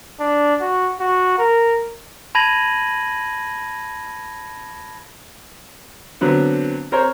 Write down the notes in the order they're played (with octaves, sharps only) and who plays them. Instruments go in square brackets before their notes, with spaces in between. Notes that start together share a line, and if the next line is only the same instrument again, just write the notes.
[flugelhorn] D4
F#4
F#4
A#4
[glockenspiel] A5 B5 G#6 A#6 D#7 F#7
[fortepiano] D3 F#3 B3 C4
C4 A#4 C5 C#5